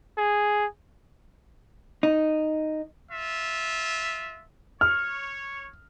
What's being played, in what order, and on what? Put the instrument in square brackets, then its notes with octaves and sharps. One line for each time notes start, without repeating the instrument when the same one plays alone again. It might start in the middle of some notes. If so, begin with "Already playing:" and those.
[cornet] G#4
[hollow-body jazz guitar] D#4
[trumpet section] F4 E5
[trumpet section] C#5 [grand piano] F6